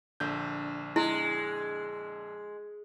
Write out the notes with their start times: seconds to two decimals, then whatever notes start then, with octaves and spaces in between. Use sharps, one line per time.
0.20 A#1 D3 G6
0.96 G#3 E4